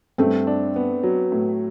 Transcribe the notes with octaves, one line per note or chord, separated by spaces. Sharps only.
G2 A3 C4
D4
B3
F#3
A2